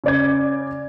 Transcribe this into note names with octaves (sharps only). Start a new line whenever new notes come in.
C#3 D5 G#6